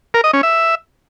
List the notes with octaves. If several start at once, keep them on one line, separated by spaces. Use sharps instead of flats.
A#4
D#5
C#4
E5